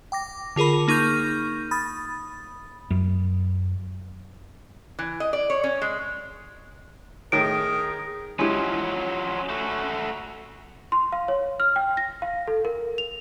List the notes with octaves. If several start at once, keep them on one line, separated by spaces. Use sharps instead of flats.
G5 D6 A#6
D3 F4 G#4 A#4 B5
A#3 D#4 C#6 F6 G6
B5 D#6 A6
F#2
E3
D#5
D5
C#5
C#4
G#3
A2 D#3 G#4 A#4 D7
F3 F#3 G#3 C#4 E4 G4
A3 F#4
C6
F5
C#5
F6
G5
A#6
F5
A4
A#4
F7